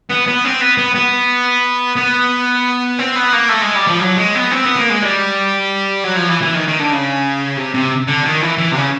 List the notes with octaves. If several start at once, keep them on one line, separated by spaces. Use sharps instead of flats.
B3
B3
C4
B3
B3
B3
B3
C4
B3
A#3
A3
G#3
G3
F3
F#3
G#3
B3
C4
B3
A#3
G#3
G3
F#3
F3
E3
E3
D#3
D#3
D3
C#3
C3
C3
D3
D#3
E3
E3
C3
C#3